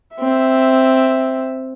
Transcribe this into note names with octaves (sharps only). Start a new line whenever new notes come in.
C4 E5